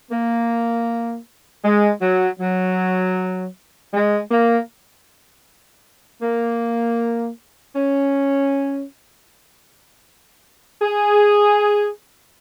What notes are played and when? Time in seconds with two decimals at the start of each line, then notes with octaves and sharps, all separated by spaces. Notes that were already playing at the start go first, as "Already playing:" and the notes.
0.11 A#3
1.63 G#3
2.01 F#3
2.40 F#3
3.93 G#3
4.31 A#3
6.22 A#3
7.76 C#4
10.82 G#4